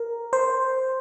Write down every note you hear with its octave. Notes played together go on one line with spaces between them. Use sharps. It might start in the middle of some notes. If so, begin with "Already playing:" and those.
Already playing: A#4
C5